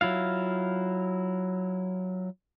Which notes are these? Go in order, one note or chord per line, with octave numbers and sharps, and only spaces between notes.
F#3 E4 F4 F5